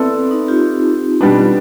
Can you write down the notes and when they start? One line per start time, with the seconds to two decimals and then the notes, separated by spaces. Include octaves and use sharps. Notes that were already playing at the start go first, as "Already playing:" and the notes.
Already playing: B3 C4 E4 A4 D5
0.31 D#4
0.48 F4 G4
1.21 B2 G3 B3 D4